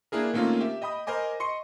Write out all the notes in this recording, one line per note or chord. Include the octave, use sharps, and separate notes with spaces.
A#3 D4 E4 G#4 A#4
D#3 A3 A#3 C4 C#4 F4
G4 E5
D#5 G5 B5 D#6
A#4 C5 D#5 G#5 D6
D#5 C6 C#6 C#7